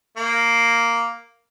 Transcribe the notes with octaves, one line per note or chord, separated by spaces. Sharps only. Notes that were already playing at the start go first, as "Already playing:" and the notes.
A#3